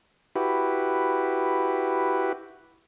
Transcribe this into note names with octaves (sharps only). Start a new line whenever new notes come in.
E4 F#4 G4 B4